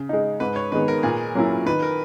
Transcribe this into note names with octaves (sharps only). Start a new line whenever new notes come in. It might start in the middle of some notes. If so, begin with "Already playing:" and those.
Already playing: C#3
G#3 D#4
G#2 B4
C#5
D#3 G#3 B3 B4
A#4
A#2 G#4
F#3 A#3 C#4 E4
D#3 B4
A#4